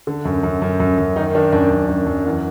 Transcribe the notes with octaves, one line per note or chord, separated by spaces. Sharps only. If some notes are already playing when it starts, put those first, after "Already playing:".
D3
F#2
F#2
F#2
F#2
F#2
D#3 D#4
D#3 D4
F#2 D4
F#2
F#2
F#2
E2